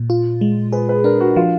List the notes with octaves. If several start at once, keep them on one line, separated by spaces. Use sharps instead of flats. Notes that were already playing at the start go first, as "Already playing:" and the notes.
Already playing: A#2
F4
G#3
G#4 B4
B4
D4 A#4
F#4
F3 F4